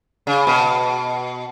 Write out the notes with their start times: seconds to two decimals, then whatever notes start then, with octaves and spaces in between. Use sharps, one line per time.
0.27 C#3
0.47 B2